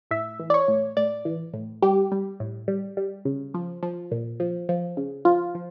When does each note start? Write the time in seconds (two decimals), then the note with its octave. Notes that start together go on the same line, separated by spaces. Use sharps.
0.11 A2 E5
0.40 E3
0.50 D5
0.54 C#5
0.68 A2
0.97 A2 D5
1.25 E3
1.54 A2
1.82 G3 G4
2.12 G3
2.40 A2
2.68 G3
2.97 G3
3.25 C#3
3.54 F3
3.83 F3
4.11 A#2
4.40 F3
4.69 F3
4.97 C#3
5.25 F3 F4
5.55 F3